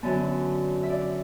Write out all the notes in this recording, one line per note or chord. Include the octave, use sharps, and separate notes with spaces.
F#2 D3 B3 A5
E5
D5